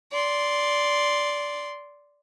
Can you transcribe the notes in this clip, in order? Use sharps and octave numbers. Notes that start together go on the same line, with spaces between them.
D5 C6